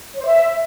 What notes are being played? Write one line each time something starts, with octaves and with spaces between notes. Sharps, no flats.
C#5
C5
E5